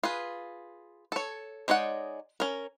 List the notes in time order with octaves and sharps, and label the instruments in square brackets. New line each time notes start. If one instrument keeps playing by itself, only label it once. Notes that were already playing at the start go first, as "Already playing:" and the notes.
[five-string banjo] F4 G#4 B4
A4 C#5
G#3 D#4 C#5 D5 F#5
C#4 A#4